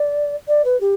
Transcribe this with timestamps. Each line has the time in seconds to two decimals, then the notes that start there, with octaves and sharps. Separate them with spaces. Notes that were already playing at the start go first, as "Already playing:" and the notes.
Already playing: D5
0.47 D5
0.64 B4
0.80 G4